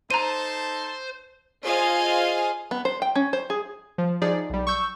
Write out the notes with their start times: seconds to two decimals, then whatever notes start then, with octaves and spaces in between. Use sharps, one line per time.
0.11 D#4 A4 C5 A5 A#5 D#7
1.64 F4 G#4 C5 D#5 F5 G#5
2.71 B3
2.85 C5
3.02 G5
3.15 C#4
3.33 C5
3.50 G#4
3.98 F3
4.22 F3 D#4 G#4 D5
4.50 B1 G3
4.67 C#6 E6 G6